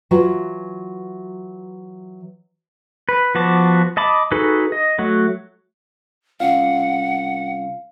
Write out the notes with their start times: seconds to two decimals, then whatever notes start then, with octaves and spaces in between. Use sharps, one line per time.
0.11 E3 F#3 F4 F#4
3.09 B4
3.35 F3 B3 F#4 A5 D6
3.97 D#5 A5 B5 D6
4.31 D#4 F#4 G#4 A4 B4
4.72 D#5
4.99 F#3 A3 F#4
6.40 C2 C#4 F4 F5 F#5